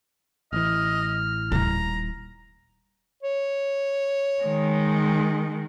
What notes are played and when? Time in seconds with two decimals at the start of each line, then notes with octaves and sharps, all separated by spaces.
0.53 A1 E3 D#5 F6
1.52 D#1 E4 A#5
3.23 C#5
4.42 D#3 G#3